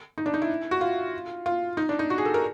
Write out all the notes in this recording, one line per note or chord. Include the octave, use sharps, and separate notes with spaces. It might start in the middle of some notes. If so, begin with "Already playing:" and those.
D#4
D4
D#4
E4
F#4
F4
F4
D#4
D4
D#4
F#4
G#4
A4
A#4